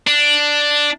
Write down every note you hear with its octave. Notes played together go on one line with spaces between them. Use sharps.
D4